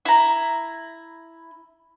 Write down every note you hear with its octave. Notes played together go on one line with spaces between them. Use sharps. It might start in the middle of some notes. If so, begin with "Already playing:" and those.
E4 A#5